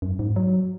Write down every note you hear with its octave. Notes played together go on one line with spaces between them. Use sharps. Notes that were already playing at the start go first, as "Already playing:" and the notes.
F#2
G#2
F#3